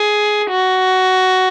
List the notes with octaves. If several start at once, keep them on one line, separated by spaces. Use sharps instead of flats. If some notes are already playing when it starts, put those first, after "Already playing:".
Already playing: G#4
F#4